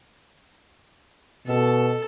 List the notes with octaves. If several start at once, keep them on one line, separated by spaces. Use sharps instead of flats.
B2 A4